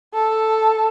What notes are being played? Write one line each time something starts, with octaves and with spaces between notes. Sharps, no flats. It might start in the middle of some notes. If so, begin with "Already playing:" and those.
A4